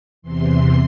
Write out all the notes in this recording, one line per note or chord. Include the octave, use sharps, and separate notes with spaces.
E2 C3 E3 C6